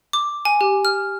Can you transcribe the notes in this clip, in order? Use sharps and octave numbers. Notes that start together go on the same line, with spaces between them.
D6
G#5
G4
F6